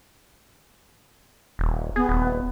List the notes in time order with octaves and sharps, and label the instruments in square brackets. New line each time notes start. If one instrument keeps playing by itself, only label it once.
[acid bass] D#1
[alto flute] B3 [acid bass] G#4
[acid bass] D#1